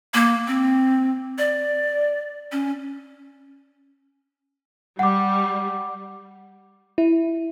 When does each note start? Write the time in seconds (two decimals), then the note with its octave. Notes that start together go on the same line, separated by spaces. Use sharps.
0.14 A#3
0.47 C4
1.38 D5
2.52 C#4
4.99 G3 F#5 D6
6.98 E4